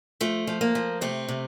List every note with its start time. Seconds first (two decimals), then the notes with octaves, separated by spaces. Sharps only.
0.21 F3 A3
0.47 F3
0.61 A#3
0.75 F3
1.01 C3 A3 C4
1.28 C3